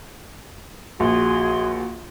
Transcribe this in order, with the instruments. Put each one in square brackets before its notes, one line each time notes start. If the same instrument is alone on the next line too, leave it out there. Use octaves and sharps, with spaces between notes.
[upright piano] A#1 [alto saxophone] F#4 [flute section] G#4 C6